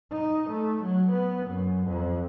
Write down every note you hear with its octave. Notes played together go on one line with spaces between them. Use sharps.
D#4
A3
F#3
B3
F#2
F2